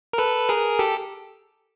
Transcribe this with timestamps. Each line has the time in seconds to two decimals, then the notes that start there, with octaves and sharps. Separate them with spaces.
0.13 A#4
0.18 A4 B4
0.49 G#4 A#4
0.79 G4 A4